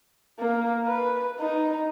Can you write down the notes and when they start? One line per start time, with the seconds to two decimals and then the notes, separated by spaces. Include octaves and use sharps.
0.39 A#3
0.87 B4
1.40 D#4